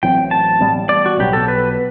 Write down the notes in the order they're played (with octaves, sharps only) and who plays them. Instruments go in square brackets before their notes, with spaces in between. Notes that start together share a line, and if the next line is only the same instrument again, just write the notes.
[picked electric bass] A1 A2 F#3 C4 [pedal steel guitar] G5
[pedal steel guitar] A5
[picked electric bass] A1 A2 G3 B3
[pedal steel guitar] D5
F#4
[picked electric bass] B1 B2 F#3 B3 [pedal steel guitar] G4
[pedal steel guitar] A4
B4